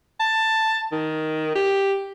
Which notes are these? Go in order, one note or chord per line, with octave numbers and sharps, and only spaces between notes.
A5
D#3
G4